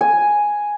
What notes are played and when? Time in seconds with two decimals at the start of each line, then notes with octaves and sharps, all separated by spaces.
0.01 G#5